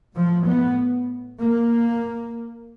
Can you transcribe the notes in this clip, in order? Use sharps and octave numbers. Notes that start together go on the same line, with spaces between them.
A2 F3
B3
A#3